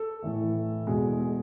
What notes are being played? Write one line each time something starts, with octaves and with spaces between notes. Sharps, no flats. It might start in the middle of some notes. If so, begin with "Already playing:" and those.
Already playing: A4
A2 E3 A3
E2 B2 G#3
G#4